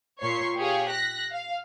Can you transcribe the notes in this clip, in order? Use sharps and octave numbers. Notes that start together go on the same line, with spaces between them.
A#2 C#5 C6 C#6 C7
G4 G#4 C#5 F5
F#6 A#6 B6
F5